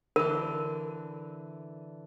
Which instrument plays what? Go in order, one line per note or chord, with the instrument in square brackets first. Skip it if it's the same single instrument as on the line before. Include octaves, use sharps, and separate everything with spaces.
[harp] D3 E3 [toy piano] A#4